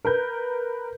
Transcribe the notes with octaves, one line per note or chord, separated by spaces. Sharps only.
A#4 B4 G6